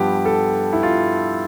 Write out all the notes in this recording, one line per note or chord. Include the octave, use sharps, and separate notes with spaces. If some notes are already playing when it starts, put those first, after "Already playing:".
Already playing: G2 F3 B3 G4
A4
E4
F4